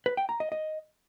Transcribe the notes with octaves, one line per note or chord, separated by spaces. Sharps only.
B4
G5
A#5
D#5
D#5